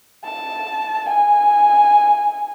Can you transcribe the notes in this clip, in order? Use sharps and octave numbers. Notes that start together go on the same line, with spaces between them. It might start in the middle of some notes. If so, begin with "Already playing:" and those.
A5
G#5